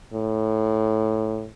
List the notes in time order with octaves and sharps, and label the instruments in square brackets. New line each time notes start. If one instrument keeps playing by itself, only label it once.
[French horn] A2